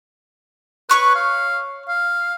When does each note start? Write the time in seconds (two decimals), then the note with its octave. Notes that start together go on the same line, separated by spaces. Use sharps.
0.90 B4 C#5 C#6 F#6
1.15 F5
1.88 F5